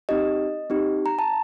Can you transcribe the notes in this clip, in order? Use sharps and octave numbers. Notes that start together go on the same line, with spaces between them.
C4 D#4 G4 D#5
C4 D#4 G4
A#5
A5